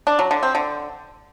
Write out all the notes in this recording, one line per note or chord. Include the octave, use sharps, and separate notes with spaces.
D4
F#3
D3
C4
D3